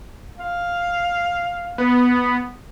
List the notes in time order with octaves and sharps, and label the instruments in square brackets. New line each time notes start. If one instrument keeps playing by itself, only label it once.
[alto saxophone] F5
[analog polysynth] B3